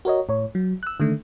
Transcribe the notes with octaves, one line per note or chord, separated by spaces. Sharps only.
F#4 A#4 C#5 D#5
A2 C#5
F#3
E6 F#6
D3 D#3 A3